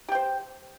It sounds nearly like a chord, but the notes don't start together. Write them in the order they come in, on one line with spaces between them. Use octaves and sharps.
G4 G5 C5